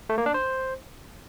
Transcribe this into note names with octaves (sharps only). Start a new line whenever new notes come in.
A3
A#3
D4
C5